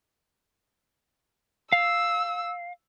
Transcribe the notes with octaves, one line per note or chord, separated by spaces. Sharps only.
F5 E6